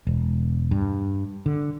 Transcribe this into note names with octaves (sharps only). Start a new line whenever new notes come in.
E1
G2
D3